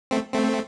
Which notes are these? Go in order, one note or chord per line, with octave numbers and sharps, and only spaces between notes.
A3 C4
A3 C4